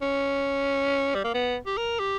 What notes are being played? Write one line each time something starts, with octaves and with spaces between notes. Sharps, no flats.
C#4
G3
A#3
B3
G4
A#4
G4